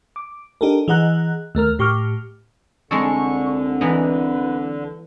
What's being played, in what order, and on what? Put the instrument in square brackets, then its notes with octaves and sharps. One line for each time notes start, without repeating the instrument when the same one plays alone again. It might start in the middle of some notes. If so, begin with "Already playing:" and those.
[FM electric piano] D6
D4 D#4 G4 A4 A#4
E3 G#4 D#5 F#5 A#5 F#6
D#2 A3 A#4 F6
A2 G4 C#6 D6 F6
[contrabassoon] C2 [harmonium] D3 [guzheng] G#3 D#4 A4 [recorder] C#6
[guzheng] E3 B3 D#4 [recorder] B4